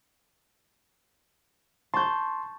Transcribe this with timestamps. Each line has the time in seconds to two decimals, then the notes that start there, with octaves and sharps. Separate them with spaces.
1.94 A5 C6 C#6 G6